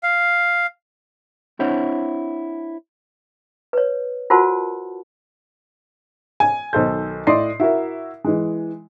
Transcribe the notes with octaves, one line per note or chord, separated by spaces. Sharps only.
F5
C4 D4 E4 C5 C#5 F#5
B4 C#5
F4 F#4 A#4 C5 F#5 A5
G#5
B1 D#3 A4 C5 G6
A2 E4 D5 D#5 C6 C7
E4 F#4 A#4 E5
E3 G#3